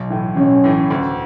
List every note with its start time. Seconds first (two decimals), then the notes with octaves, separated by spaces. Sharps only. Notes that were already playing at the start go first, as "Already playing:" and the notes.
Already playing: B1
0.10 A2 E3
0.37 B1 C#4
0.64 A2 E3
0.90 D2